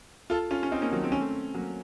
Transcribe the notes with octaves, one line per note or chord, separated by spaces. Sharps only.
F4 A4
C#4 F4
C#4
C4 D#4
A#3 C#4
D#3 F#3
C4
C#4
A3 C4
F#3 A#3